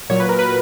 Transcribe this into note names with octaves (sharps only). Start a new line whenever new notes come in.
A#2 F#3 C#5
B4
A#4
B4